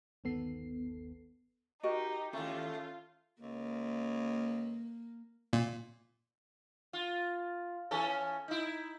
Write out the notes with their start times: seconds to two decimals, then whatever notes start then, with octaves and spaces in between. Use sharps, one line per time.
0.24 G1 D#2 D#3 B3 A4 C7
1.83 D#4 F#4 G4 A#4 D#5
2.33 D#2 A3 C#4 F4 A4
3.42 C#2 A#3
5.53 A#2
6.93 F4
7.91 E3 C#4 A4
8.48 D#4 E4